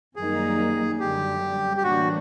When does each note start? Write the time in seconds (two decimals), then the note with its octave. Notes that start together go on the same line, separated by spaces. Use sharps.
0.15 F#2 D#3 G3 A#3 D#4 G#4
0.99 F#2 D3 G3 G4
1.77 G4
1.83 A2 E3 G3 A#3 D4 F#4